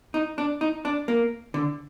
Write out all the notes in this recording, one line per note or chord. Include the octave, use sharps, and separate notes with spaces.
D#4
D4
D#4
D4
A#3
D3